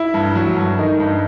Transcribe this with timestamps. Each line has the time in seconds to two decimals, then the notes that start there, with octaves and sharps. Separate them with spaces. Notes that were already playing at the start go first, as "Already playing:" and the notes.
Already playing: E4
0.14 G2
0.35 F#3
0.56 G2
0.78 D#3 D#4
1.00 G2